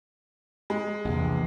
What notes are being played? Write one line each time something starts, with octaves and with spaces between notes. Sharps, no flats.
G#3
A#1 E2 C3